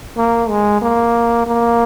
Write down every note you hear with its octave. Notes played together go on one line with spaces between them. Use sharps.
A#3
G#3
A#3
A#3